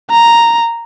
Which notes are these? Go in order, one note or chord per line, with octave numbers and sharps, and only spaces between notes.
A#5